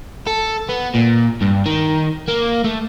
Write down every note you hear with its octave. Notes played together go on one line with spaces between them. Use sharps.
A4
B3
A#2
G2
D#3
A#3
A3